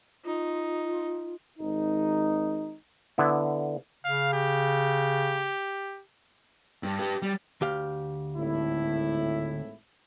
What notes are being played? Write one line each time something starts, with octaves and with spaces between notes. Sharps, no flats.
D#4 F4
G#1 D#4
D3 B3 E4
C#3 F5
G4
G2
G4 B4
G3
D2 G4 F5
G#1 A2 E4